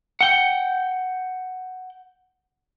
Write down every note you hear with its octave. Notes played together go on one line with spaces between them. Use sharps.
F#5 G5